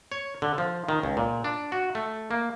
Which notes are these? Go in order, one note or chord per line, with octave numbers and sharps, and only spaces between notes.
C#5
D3
F3
D#3
C#2
A#2
D4
F#4
A3
A#3